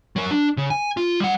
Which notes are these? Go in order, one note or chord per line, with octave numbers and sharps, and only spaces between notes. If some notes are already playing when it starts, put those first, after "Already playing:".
F#3 A#4
D4
C#3
G#5
F4
G3 F#5